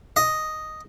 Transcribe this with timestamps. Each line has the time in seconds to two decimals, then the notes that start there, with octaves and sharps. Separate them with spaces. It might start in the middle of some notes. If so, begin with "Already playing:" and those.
0.16 D#5